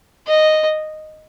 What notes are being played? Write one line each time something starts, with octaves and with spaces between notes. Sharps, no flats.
D#5